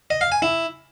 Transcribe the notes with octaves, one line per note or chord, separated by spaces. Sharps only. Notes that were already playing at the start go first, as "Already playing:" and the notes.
D#5
F5
G#5
E4